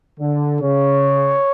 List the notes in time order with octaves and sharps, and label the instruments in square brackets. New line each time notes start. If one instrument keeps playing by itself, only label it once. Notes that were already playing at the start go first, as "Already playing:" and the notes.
[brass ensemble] D3
[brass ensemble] C#3 [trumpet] C#5